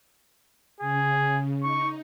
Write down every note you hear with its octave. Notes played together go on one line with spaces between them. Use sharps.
C#3 G#4
D#4 C#6